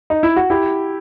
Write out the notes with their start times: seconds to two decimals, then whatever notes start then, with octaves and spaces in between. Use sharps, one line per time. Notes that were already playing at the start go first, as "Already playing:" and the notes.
0.10 D#4
0.23 E4
0.36 F#4
0.50 E4 G4